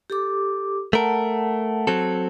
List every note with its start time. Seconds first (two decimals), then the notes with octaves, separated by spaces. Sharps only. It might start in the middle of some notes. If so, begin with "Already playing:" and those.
0.10 G4 A4 D6
0.93 A3 A#4 F#5 A5
1.87 F#3 C4 A4